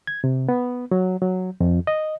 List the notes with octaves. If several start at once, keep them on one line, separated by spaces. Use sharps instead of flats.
G#6
C3
B3
F#3
F#3
F2
D#5